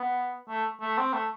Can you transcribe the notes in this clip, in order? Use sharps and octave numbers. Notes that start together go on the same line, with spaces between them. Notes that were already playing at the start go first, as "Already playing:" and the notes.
Already playing: B3
A3
A3
C4
A3